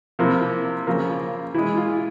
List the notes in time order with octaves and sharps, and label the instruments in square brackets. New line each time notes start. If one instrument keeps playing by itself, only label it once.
[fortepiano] C3 F3 A#3 E4
C#3 F3 A#3
E3 G#3 E4
F4